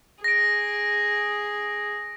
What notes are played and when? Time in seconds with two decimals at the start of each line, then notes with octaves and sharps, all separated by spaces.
0.24 G#4 A#6 D7